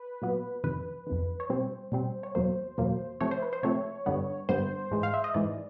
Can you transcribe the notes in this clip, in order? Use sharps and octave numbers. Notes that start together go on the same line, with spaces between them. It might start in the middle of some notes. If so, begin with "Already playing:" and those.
Already playing: B4
A#2 F#3 B3
F2 C3 D#3 B4
F2 C3 D#3
C#5
B2 G3 C4 C5
B2 G3 C4
C#5
E2 B2 F#3 A#3 C5
E2 B2 F#3 A#3
C3 F3 A3 C4 C#5
C5
B4
C5
C3 F3 A3 C4 C#5
G2 D3 G3 B3
G2 D3 G3 B3 C5
G#2 E3 G#3
F5
E5
D#5
G#2 E3 G#3 D5